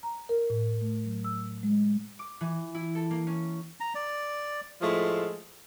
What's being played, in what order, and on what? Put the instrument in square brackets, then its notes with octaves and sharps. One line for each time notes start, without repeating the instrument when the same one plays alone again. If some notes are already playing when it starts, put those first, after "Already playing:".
[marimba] A#5
A#4
A2
A3
F#3
E6
G#3
[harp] D6
E3
E4
A4
A#3
C#4
[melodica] A#5
D5
[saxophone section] A2 F3 G#3 A3